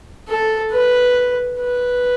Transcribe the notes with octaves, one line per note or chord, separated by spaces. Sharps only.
A4
B4
B4